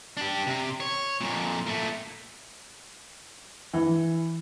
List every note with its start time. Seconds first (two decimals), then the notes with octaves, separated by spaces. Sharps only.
0.17 D4 G4
0.47 C3
0.80 C#5
1.21 F2 A#2
1.66 A#2 A3
3.74 E3